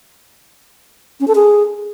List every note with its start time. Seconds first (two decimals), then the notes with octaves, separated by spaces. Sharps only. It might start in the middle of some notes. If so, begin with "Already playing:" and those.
1.20 C#4
1.28 A4
1.35 G#4